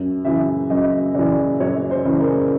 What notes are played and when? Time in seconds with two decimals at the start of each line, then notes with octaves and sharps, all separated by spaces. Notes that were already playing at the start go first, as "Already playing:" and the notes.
Already playing: F#2
0.25 C#3 E3 E5
0.70 F#2 D#5
1.15 C#3 E3 D5
1.60 F#2 C#5
1.91 C5
2.05 C#3 E3
2.20 A#4